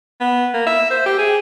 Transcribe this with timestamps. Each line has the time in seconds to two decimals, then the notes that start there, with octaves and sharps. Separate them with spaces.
0.21 B3
0.54 A#3
0.66 E5
0.91 C5
1.06 G4
1.18 G#4